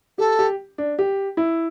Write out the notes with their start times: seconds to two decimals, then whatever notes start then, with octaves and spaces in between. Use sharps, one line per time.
0.18 G4 A4
0.39 G4
0.78 D4
0.99 G4
1.37 E4